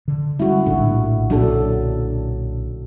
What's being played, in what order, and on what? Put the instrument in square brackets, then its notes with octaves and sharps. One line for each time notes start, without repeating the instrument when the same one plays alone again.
[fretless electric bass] D3
[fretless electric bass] G3 G#3 C#4 [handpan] E4 F#4
[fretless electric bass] A#1 A2 [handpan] D3
[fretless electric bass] B1 A#2 [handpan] F#3 D4 A4